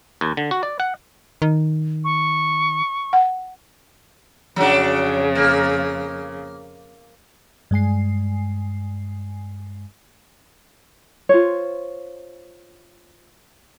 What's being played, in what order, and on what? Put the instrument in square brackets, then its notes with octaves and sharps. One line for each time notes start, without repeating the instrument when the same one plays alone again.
[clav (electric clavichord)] D#2
D3
F#4
D5
F#5
[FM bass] D#3
[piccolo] C#6
[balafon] F#5
[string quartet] F2 C#3 [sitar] F#3 D4
[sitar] A#3
[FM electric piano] G2 G#3 G#5 C7
[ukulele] F4 C5 C#5